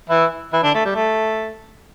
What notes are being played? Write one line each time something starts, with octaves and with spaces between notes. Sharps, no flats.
E3 E4
E3 E4
D3 D4
A3
G3
A3